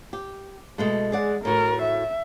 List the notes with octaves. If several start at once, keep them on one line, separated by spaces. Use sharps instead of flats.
G4
B2 G#3 A3
G#3 G#4 D5 F#5
A2 F#4 A#4
E5